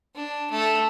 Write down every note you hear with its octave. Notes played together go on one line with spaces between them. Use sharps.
D4
A3